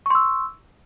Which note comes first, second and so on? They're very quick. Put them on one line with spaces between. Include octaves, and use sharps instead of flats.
C#6 C6 E6